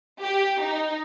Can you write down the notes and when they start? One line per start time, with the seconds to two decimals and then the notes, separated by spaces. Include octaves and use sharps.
0.21 G4
0.61 D#4